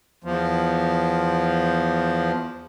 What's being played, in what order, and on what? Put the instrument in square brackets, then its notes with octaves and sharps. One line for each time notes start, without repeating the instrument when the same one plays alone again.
[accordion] E2 F3